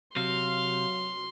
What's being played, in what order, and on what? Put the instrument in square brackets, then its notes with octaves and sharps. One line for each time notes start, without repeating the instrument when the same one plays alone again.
[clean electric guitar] C3 [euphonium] F#3 [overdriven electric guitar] F5 [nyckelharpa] C6